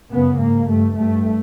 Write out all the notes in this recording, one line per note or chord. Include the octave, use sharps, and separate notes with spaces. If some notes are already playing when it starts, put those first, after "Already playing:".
F#2 C#3 B3
G#2 A#3
G2 A3
G2 A3